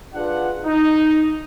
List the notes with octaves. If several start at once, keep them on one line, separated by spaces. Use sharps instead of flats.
D4 F4 G#4 B4 F#5
D#4